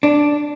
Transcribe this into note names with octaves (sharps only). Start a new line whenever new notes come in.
D4